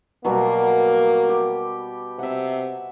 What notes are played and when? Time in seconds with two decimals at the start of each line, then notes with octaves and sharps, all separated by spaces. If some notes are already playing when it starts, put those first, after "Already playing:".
0.24 B2 F#3 G3 A#3
1.29 G4
2.19 C3 E5 F#5